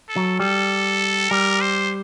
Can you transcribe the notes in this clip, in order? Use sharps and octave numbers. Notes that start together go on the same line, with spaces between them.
A4
F#3
G3 A4
G3 A#4
C5